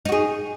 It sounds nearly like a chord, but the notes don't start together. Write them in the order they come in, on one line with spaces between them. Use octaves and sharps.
D#4 F#4 G#4